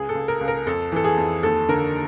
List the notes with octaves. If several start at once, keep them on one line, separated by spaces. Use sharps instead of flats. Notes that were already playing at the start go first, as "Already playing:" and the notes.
Already playing: C#2 G#4
A4
C#2
A#4
C#2
A#4
F2 A4
E3 A4
G#4
F2
D#2 A4
D3 A#4